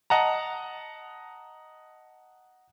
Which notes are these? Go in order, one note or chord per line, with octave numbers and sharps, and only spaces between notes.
D#5 F#5 A5 A#5